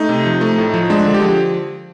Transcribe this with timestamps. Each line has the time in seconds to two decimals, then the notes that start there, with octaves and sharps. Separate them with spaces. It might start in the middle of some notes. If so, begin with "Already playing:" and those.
Already playing: A3 D#4
0.09 C3
0.26 F3
0.41 A3
0.58 A2
0.74 F3
0.90 G#3 D4
1.06 D3
1.14 G4
1.22 F3